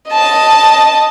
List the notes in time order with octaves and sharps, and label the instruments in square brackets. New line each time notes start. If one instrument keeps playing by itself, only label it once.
[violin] D#5 A5